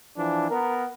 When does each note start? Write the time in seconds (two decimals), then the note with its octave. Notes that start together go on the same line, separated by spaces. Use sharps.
0.18 E3 F3 D4
0.51 B3 A#4